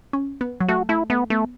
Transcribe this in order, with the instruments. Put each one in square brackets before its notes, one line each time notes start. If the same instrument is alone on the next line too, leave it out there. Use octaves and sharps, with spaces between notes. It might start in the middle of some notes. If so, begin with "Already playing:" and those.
[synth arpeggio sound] C#4
B3
F#3
[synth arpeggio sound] A3 [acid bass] F#4
[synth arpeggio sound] A3 [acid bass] E4
[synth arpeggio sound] A3 [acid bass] B3
[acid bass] A3 [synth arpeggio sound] B3